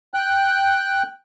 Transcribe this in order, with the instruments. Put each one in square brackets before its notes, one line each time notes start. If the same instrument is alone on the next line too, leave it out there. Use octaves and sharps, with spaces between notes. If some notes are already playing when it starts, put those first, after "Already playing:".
[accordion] G5 F#6